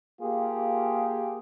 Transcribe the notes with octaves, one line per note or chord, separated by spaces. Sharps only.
A#3 F4 G4 G#4